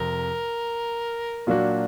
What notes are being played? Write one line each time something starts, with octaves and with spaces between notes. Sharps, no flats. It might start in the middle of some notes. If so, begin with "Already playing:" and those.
Already playing: F2 C3 A#4
A#2 F#3 A#3 D4 F#4